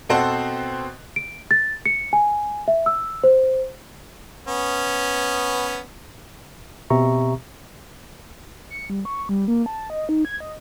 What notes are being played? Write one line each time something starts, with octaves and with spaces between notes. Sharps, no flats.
B2 C4 A4 C5 F#5 C6
D7
A6
C#7
G#5
E5
E6
C5
B3 C#4
B2 C4 G4 E5 A#5 C#6
C#7
G3
C#6
G3
A#3
A5
D#5
D#4
G#6
D#5